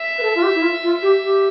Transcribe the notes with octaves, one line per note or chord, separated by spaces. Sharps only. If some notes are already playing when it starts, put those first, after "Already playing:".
Already playing: E5
B4
A4
F4
G4
E4
F4
F4
G4
G4